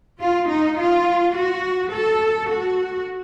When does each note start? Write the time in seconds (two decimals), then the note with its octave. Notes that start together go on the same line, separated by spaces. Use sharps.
0.22 F4
0.50 D#4
0.79 F4
1.35 F#4
1.92 A4
2.49 F#4